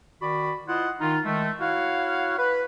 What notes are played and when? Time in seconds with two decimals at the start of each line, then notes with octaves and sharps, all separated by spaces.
0.21 D#3 F#4 D5 B5
0.68 E4 F4 C5 D#5 F#5
1.01 D#3 D#4 F4
1.25 D#3 G#3 A3
1.60 E4 F#4 C#5 F5 F#5
2.38 B4